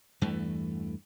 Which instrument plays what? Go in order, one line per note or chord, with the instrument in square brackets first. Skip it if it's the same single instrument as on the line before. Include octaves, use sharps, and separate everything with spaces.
[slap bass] E2 G2 E3 A3